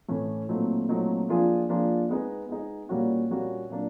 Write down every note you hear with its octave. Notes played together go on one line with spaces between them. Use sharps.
A2 E3 A3 C#4
A#2 F#3 A3 C4 D#4
A#2 F#3 A3 C4 D#4
F3 A#3 D4 F4 G#4
F3 A#3 D4 F4 G#4
G#3 B3 D#4 G#4
G#3 B3 D#4 G#4
A#2 G3 A#3 C#4 F#4
A#2 G3 A#3 C#4 F#4
A#2 F#3 A#3 D4